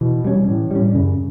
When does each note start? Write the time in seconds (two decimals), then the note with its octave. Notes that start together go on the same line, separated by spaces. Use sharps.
0.01 B2 E3
0.25 G3 C#4
0.48 A2 E3
0.71 G3 C#4
0.94 F#2 C#3